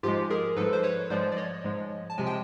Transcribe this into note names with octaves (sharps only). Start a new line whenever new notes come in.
G#2 F3 G#3 F4 G4
G#4 A#4
G#2 F3 G#3 A4 B4
C5
B4 C#5
G#2 F3 G#3 C5 D5
D5
C#5 D#5
G#2 F3 G#3
A5
C3 F3 G#3 G#5
G5